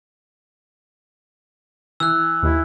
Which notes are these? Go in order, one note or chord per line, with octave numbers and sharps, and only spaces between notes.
E3 E6 F#6
D#2 E4